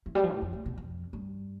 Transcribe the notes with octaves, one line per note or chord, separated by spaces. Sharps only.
E3
G3
F3
A2
F2
A2
B2
F2
G2